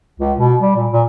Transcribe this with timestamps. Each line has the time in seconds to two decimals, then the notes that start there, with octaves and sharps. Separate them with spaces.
0.20 C#2
0.39 B2
0.60 G3
0.76 A#2
0.92 A#2